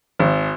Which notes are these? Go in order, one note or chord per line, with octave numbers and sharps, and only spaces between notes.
G#1